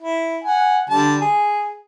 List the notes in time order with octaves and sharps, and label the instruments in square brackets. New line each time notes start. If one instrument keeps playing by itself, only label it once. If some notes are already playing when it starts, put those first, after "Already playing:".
[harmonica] E4
F#5 G#5
D3 G3 A5
G#4